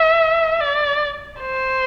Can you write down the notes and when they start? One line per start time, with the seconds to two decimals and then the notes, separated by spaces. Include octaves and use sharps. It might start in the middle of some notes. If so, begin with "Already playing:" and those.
Already playing: E5
0.60 D5
1.41 C5